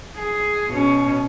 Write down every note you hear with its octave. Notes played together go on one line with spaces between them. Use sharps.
G#4
B2 C#4